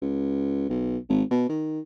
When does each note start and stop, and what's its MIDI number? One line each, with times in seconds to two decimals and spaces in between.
0.02 0.68 37
0.70 0.97 35
1.09 1.23 32
1.31 1.45 47
1.49 1.80 51